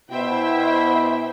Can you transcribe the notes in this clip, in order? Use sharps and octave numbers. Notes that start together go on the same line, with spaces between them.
B2 B3 E4 C5 E5 G5